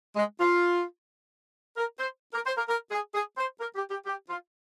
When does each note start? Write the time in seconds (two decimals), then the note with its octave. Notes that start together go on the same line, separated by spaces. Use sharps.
0.16 G#3
0.40 F4
1.77 A#4
2.00 C5
2.34 A#4
2.46 C5
2.58 A#4
2.69 A#4
2.91 G#4
3.14 G#4
3.37 C5
3.60 A#4
3.75 G4
3.90 G4
4.06 G4
4.29 F4